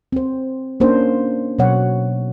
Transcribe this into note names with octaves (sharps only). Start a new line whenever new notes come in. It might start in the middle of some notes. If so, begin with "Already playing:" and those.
C4 C5
A#3 C#4 D4 A#4 C5
B2 F#3 C#5 F#5